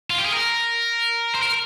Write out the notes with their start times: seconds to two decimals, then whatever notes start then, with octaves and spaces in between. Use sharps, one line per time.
0.10 F4
0.18 G4
0.26 G#4
0.33 A#4
1.35 C5
1.43 A#4